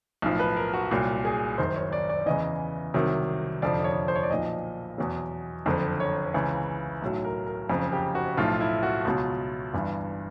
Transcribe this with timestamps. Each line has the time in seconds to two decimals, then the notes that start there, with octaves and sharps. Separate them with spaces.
0.22 B1 A2 F3
0.40 B4
0.57 A#4
0.73 F#4
0.91 C2 A#2 F#3
1.25 G#4
1.58 F#1 F#2 D#3 C5
1.76 C#5
1.92 D5
2.09 D5
2.26 E2 C#3 E3 D#5
2.94 C2 C3 D#3 F#3
3.62 F1 F2 D3 F3 D5
3.84 C#5
4.08 C5
4.15 C#5
4.23 D5
4.30 B1 A#2 F3 D#5
4.98 E2 B2 F#3
5.66 F#1 F2 D3
6.00 C#5
6.34 C#2 C#3 E3
7.02 B1 A2 F#3
7.24 A#4
7.47 A#4
7.70 F#1 F2 C#3
7.92 G4
8.15 F#4
8.37 B1 A2 F3 F4
8.61 E4
8.83 F#4
9.05 C#2 B2 F#3 F4
9.74 G1 G2 E3